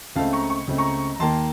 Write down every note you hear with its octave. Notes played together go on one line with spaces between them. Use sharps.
C#2 C#3 A3 C4 F5 A5
A#5 C#6
C#6
C#2 C#3 A3 C4
A#5 C#6
A#5
D#2 D#3 A#3 A5 C6